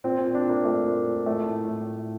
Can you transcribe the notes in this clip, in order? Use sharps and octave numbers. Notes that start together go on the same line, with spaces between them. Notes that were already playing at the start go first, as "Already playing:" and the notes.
A#2 C4
A#2 C4
D4
A#2
A#3
A#2 A3
A#2
A#2
A2 A3
A2
A2
A2